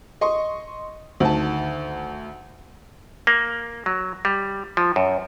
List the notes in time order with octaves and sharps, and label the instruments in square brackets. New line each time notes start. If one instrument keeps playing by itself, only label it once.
[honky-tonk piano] D#5 C6 C#6
D2 D#3 A5
[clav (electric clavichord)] A#3
F#3
G3
F3
F#2